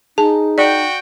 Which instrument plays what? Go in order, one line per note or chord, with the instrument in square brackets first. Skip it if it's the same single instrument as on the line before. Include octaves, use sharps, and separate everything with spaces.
[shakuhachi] D#4 [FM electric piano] G#4 [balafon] A5
[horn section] F#4 G5 [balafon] D5